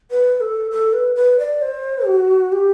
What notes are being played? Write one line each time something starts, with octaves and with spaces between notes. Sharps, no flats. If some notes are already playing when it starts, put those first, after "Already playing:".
B4
A4
A4
B4
B4
D5
C5
F#4
G4